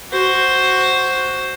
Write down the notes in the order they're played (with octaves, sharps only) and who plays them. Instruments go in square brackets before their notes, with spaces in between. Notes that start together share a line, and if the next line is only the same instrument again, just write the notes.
[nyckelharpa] F#4 C5